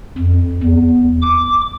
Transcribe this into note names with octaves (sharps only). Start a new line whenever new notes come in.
F2
E2
D6